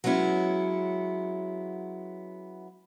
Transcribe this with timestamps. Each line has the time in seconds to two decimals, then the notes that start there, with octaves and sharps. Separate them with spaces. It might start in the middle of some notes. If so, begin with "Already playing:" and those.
0.04 F#3 G#3 B3 C#4 E4